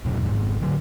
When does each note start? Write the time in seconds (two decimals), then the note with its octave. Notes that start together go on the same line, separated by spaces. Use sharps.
0.05 D#2 A#2 C#3 F#3
0.23 G#1 C#2 G#2
0.61 D3 F#3